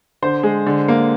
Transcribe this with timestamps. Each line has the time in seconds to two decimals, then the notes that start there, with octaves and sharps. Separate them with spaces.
0.22 D3 C5
0.43 G#3
0.66 D3
0.88 A#3